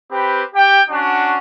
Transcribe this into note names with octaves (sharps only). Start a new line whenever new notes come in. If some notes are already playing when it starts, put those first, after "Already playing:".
C4 G4 B4
G4 G5
C#4 D4 F#4